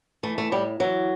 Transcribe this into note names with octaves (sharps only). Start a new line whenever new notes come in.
E3 A3
A3
A2 G3
E3 F#3